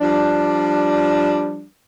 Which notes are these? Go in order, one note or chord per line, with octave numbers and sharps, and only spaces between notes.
F3 G3 D4